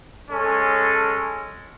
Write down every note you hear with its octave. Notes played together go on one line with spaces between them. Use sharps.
G#3 C#4 A4